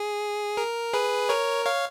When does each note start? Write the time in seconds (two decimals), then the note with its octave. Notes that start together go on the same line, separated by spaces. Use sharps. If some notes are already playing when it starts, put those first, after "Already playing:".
Already playing: G#4
0.57 A#4
0.93 G#4 B4
1.29 A#4 C#5
1.65 C#5 F5